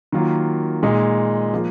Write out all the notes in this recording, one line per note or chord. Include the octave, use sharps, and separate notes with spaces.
D#3 F#3 A#3 F4
A#2 G#3 D#4 G#4
F3 A#3 F4